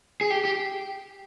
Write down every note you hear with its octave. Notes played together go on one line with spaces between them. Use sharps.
G#4
G4
G4